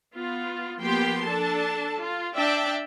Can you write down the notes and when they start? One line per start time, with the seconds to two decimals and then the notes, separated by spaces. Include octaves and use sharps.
0.13 B3 F4
0.78 F3 A#3 B3 G4 G5 C6
1.25 D4 A4 A5
1.97 F4
2.35 D4 D5 E5 G5 A5